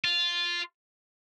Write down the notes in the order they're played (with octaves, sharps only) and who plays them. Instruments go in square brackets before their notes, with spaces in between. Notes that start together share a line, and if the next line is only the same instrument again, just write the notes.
[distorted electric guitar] F4